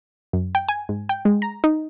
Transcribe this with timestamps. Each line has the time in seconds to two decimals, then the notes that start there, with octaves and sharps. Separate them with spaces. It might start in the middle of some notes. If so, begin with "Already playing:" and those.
0.33 F#2
0.55 G5
0.69 G#5
0.89 G#2
1.09 G5
1.25 G#3
1.42 A#5
1.64 D#4